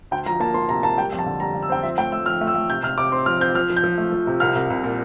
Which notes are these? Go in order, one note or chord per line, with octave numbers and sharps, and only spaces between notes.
D2 G5
F3 A#5
A#3 A5
A#3 C6
C3 A#5
A#3 A5
G3 G5
F2
A5
D3
G3 A#5
D3
E6
C4 G5
F3 E5
A3 G5
A3 E6
F3 F6
A3
E6
A3
C3 G6
C3 F6
C3 D6
C4 C6
F3 F6
C4 G6
F3 F6
F3
G6
F3
A3
F3
C3
C2 F6
C2
C2
A#2